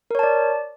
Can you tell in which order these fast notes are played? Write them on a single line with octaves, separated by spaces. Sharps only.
A#4 C#5 A5 D5